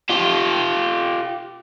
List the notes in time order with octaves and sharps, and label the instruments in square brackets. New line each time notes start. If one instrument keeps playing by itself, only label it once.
[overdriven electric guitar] F4 G4